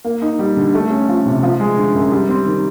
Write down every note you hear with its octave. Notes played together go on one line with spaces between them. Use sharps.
A#3
D#4
G3
D3
A3
C#4
F3
C3
F3
G#3
D3
F#2
G3
C4
D#3